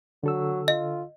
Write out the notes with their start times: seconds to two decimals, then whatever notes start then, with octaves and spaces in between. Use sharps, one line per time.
0.24 D3 F#3 A4 E6
0.68 F4 D#5